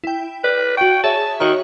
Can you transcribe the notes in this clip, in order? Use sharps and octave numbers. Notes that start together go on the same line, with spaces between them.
E4 G5
B4 D5
F#4 G5 C#6
G#4 C#5 E5 A5
D#3 F#4 C#5 A#5